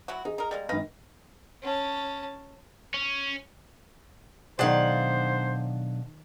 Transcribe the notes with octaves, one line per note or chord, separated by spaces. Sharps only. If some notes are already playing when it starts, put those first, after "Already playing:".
F#3 E4 F#4
D#4 G#4 D#5
D#4 A#4
G3 G#3 A#3
G#1 D#4 B4 F5 A#6
C#4 A5
C#4
B1 D#3 D4 G#4 C5 F5 F#5